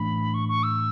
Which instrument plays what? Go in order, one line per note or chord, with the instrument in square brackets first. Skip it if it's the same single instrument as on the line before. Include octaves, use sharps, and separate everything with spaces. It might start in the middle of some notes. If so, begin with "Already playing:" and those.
Already playing: [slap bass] A2 E3 A3 D4 [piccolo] B5
[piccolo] C#6
C#6
E6